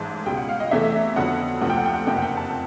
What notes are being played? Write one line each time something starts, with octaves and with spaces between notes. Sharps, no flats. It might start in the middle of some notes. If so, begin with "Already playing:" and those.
Already playing: A1 G#2 E3 G#3 A5
C#2 B2 G3 G5
F#5
F5
D#5
E2 C3 E3 A3 E5
F2 D3 F#3 B3 F#5
D2 C3 F3 F#5
G5
F#5
G5
F#5
F#1 F2 C3 G5
F#5
G5
A5